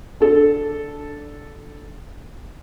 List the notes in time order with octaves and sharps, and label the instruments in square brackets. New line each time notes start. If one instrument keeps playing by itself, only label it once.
[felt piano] D4 A4